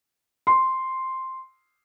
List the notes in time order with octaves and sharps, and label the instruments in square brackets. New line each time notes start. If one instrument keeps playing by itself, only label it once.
[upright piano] C6